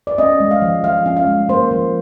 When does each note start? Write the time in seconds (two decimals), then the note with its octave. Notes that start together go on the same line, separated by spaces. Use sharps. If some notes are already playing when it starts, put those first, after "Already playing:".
0.07 D5
0.18 C#4 D#5
0.40 G#3
0.51 F5
0.62 F3
0.84 F3 F5
1.06 C#4
1.17 F5
1.27 G#3
1.49 A#3 C5
1.71 F3